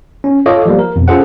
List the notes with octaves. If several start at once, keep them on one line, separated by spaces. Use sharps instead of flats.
C#4
F4 A4 C#5 D#5 F5 D6
F3 G3 A#3
A#4
F2 B2
C#4 F4 G#4 A4 C5 F#5